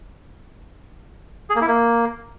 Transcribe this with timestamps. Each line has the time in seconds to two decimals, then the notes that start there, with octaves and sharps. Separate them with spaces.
1.50 G#4
1.56 A#3
1.62 E4
1.67 A#3